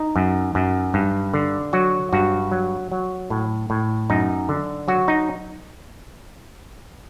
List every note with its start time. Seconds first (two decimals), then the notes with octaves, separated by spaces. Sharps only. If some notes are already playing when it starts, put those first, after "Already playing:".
Already playing: D#4
0.16 F#2
0.55 F#2
0.94 G2
1.34 D3
1.73 F#3 F#4
2.13 G2 F#4
2.52 F#3
2.92 F#3
3.30 A2
3.70 A2
4.10 F#2 D#4
4.49 D3
4.88 F#3 F#4
5.08 D#4